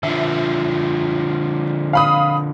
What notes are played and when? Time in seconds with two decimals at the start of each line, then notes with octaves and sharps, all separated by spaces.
0.03 D3 F3 E5
1.93 F5 B5 D#6